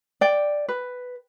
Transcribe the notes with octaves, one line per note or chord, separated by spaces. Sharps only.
D5 G5
B4